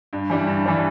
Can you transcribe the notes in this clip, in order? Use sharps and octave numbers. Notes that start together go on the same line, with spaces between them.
G2
E3 G3 D4
G2
E3 G3 D4